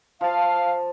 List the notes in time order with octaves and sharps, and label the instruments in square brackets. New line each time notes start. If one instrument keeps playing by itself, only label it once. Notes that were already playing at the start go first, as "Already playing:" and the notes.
[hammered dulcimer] F3 A5 [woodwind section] F5